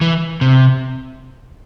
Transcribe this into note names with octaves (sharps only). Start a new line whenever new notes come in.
E3
C3